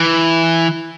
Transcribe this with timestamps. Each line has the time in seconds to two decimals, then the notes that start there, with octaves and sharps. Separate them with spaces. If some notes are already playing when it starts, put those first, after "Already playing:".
Already playing: E3